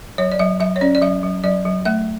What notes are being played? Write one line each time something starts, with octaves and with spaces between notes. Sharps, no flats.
F#3 C#5
D5
F#3 E5
F#3 E5
C#5
C#4 D5
D5
F#3 E5
F#3
F#3 D5
F#3
A3 E5